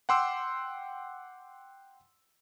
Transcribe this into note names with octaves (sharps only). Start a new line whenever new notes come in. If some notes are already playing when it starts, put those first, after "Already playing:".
F#5 G5 C6 D6 E6